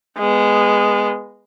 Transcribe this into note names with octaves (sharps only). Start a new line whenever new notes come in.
G#3 B3